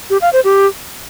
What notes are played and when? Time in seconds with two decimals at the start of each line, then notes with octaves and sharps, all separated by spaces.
0.10 G4
0.22 F5
0.33 C5
0.44 G4